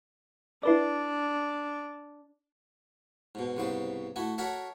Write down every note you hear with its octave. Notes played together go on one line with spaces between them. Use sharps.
D4 E4 B4 D5
G#2 B2
C2 G#2 C#3 B3 C5
A3 E4 F#4
F#4 A4 A#4 C#5 E5 F#5